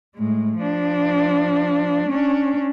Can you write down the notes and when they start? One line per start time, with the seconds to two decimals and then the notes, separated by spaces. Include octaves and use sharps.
0.15 A2 G#3
0.57 F3 D4
2.09 C#4 D4